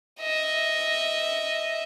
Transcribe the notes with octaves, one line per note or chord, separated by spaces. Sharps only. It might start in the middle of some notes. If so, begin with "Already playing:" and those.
D#5 E5